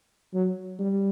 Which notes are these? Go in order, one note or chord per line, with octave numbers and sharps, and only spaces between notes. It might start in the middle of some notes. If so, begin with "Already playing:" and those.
F#3
G3